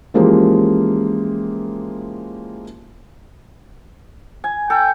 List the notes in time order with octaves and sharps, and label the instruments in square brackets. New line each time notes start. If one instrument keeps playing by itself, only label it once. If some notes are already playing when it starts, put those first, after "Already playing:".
[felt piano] E3 F3 G#3 A#3 C#4 G4
[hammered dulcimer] G#5
[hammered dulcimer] A4 [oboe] G5